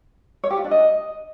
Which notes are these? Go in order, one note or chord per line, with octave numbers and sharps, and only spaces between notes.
C#5
G4
F4
D4
D#5